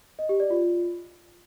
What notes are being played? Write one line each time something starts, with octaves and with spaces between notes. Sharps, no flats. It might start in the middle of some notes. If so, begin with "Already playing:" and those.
D#5
G4
D5
F4